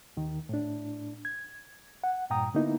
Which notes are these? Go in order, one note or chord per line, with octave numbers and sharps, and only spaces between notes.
D#2 D#3
A2 D4
G#6
F#5
G2 A#2 G5 A#5 D#6
D3 A#3 B3 D#4 E4